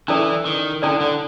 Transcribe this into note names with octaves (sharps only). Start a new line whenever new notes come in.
E3 C#4 E4 A4 D5
D#3
D3 C#4 E4 A4 D5
D3